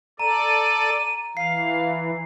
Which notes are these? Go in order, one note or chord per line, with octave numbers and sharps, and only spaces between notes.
A4 D5 A#5 D#7
E3 F5 C7